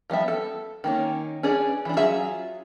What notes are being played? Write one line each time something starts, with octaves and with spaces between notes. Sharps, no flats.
F3 G3 B3 E5
A4
D#3 A#3 C#4
C#4 D4 G#4 B4 D5
E3 D4
F#3 C#4 F4 G#4 E5